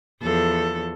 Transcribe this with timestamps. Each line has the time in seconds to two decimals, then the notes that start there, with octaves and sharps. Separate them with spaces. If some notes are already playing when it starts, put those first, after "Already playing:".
0.23 E2 F3 A4